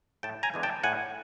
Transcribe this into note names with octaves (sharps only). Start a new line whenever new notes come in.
A2 G5 A5
G#5 A#5
E3 G#3 B3 D4
G5 A5
A2 F#5 G#5